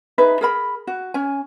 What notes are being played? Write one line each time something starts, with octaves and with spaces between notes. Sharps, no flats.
D#4 G#4 B4 E5
G#4 A#4 B5
F#4
C#4 G#5